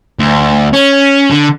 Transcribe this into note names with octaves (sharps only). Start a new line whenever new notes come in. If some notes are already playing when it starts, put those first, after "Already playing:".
D2
C#4
D3